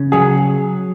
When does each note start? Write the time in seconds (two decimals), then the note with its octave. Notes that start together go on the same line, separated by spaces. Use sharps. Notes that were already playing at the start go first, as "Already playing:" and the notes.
Already playing: C#3
0.12 F#3 G#4